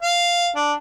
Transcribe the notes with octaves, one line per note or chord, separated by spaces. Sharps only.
F5
D4